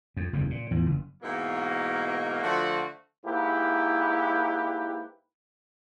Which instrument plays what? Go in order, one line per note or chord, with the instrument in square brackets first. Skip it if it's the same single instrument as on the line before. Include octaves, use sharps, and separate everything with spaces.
[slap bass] F2
F#1 E2 G2
A#2
E2 A2 F3
F#1
[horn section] G#2 B2 E3 A#3
D3 F3 A3 F4 F#4
[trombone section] G#2 A#3 E4 G4 B4